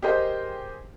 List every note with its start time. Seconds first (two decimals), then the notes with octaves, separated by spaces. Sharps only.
0.02 G4 G#4 A#4 C5 D#5 G5